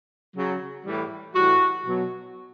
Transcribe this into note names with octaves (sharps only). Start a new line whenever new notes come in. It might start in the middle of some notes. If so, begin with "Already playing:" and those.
C#3 F#3
A2 E3 G3
A2 E3 G3 F#4
B2 F#3